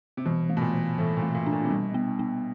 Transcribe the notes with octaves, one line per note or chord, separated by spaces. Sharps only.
C3
B2 E3
A3
B2
A#2
E3
A2 E3
A#2
A3
A#2
D4
A#2
C3
B2 G3
B3
B3